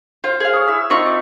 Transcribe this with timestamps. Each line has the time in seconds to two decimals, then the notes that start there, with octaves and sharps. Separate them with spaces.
0.24 F4 C5
0.40 G#4 F5
0.53 C#5 D#6
0.67 E4 E5 E6
0.90 C4 D#4 F4 E5 C#6
1.06 D5